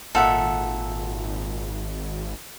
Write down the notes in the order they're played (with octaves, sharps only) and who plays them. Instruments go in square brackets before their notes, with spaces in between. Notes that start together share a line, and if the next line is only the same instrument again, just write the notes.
[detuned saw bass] G#1 [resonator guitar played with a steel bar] A#2 F#5 [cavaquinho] A4 E5